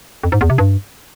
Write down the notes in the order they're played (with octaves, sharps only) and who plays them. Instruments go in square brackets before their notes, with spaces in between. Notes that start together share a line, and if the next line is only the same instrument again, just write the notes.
[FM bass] F2
G#2
E2
C3
G2